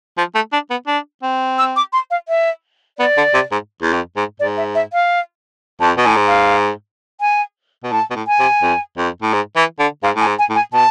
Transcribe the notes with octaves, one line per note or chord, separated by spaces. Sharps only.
F3
A3
D4
B3
D4
C4
E6
D6
C6
F5
E5
B3 D5
D3
C3
G#2
E2
F2
G#2
G#2 D5
E5
E5
F5
F2 A5
B2
A2 G#5
G#2
F5
G#5
B2
A2 A5
B2
A2
G#5
C3
F2
F2
A2
G#2
E3
D3
G#2 F5
A2 G#5
G#2
G#5
A2
G#5
B2 A5